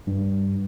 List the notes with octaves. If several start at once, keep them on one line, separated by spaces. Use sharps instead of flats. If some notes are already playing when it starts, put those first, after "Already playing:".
G2